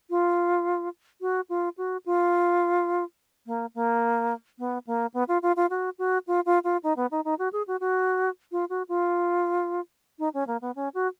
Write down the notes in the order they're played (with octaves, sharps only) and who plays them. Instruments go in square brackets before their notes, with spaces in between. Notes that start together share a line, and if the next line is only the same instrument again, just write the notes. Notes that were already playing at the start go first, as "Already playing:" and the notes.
[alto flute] F4
F#4
F4
F#4
F4
A#3
A#3
B3
A#3
B3
F4
F4
F4
F#4
F#4
F4
F4
F4
D#4
B3
D#4
D#4
F#4
G#4
F#4
F#4
F4
F#4
F4
D#4
C#4
A#3
B3
C#4
F#4